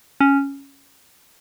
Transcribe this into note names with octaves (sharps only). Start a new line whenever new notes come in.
C#4